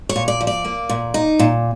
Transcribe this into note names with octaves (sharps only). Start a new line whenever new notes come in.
C#5
A#2
D5
F3
D5
A#3
A#2
D#4
A#2